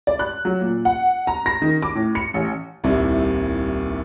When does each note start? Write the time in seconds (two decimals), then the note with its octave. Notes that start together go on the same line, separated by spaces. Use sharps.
0.07 D5
0.19 F#6
0.45 F#3
0.61 A#2
0.85 F#5
1.27 A#5
1.46 A#6
1.62 D#3
1.82 D6
1.95 A2
2.15 C#7
2.34 A1
2.84 D#1 C2 C3 E4